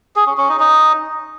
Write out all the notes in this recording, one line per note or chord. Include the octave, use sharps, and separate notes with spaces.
G#4
C#4
C#4
D#4
D#4